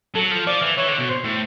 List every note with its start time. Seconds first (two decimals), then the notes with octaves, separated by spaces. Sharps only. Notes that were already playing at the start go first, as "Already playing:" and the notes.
0.15 F#3 A4
0.31 F3
0.47 F3 D5
0.62 E3
0.77 E3 C#5
0.88 D3
0.98 B2
1.09 C5
1.24 A2